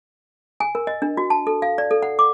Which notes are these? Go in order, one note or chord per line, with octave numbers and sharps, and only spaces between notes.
G#5
A#4
D#5
D4
F#4
A5
A4
F5
D5
A4
F#5
D6